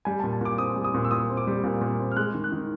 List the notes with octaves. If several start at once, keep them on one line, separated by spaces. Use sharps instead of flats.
G3 G#5
A5
A#2
A5
A#2 D6
C4 D#6
G3
D#6
A#2
E6
A#2 D#6
C4
D6
G3
A#2
A#2
C4
F6
G#3 F#6
D#3
F#6
D#3